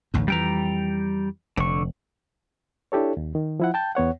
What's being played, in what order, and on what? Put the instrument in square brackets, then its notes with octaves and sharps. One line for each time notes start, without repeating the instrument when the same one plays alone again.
[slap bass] A1 D2 G#2
[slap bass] F2 E3 [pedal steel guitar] G3 G5 A#5
[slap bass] F1 [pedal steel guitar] D3 C#6
[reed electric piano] D4 E4 G4 A4 C#5
D#2
D#3
F3 E4 F#5
G5 A5 G6
E2 B3 C#5 F#5